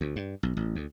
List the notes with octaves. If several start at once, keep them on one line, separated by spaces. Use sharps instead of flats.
D2
G2
B1
A1
D2